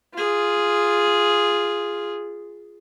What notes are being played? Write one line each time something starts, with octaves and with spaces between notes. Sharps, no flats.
F4 G#4